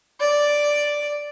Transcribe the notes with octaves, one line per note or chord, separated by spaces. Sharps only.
D5